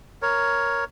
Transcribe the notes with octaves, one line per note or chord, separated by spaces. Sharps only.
A#4 C#5